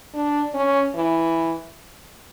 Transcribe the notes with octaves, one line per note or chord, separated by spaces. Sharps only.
D4
C#4
E3